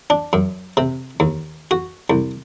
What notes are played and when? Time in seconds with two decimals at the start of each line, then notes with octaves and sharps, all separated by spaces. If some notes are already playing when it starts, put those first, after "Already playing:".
0.10 D4
0.33 F#2
0.77 C3
1.20 D#2
1.71 F#4
2.10 C2